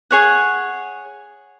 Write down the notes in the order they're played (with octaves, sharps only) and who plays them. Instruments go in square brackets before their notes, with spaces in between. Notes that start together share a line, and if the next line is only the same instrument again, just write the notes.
[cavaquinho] G#4 C#5 F#5